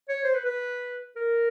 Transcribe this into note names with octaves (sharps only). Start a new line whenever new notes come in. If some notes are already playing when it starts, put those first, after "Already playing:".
C#5
C5
B4
B4
A#4